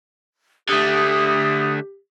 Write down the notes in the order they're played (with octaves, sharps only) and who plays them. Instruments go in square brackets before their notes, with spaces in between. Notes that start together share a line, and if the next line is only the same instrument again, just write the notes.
[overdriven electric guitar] D3 A3 [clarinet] G4 [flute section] D#6